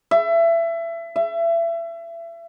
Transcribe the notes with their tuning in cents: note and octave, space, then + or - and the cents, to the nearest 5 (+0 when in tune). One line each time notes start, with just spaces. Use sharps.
E5 +25
E5 +30